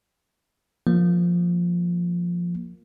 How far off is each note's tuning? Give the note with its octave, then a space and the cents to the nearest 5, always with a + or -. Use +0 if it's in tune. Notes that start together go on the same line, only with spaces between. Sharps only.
F3 +0 A#3 +0